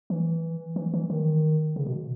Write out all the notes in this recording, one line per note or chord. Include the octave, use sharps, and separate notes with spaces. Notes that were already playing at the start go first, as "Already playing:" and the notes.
E3
E3
E3
D#3
C#3
B2